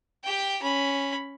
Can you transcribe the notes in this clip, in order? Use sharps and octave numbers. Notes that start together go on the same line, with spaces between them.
G4 G5
C#4 B5